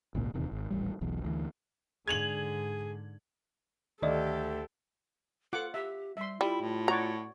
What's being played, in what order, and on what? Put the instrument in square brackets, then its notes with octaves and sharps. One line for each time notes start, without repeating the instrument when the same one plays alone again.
[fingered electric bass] G#1 C#2 A#2
D#1 E2 C3 D#3
G#1
D#1 A1 G3
E1 B1 E2
D2 E3
[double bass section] G#2 D3 [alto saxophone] G#4 [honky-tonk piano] G#6 F7 F#7
[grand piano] D2 [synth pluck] D#3 D5 D#5 [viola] G4 A4
[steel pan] F4 F#5 D6 [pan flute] A4
[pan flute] G4 [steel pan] E5
[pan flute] G3 [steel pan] E5 C6
[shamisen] G3 [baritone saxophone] E4 [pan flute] F4
[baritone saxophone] A2
[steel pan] F#4 C#5 D5 [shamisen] A#5